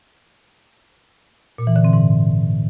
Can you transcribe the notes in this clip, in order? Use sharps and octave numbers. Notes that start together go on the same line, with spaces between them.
A#2
E3
D3
C4
G#2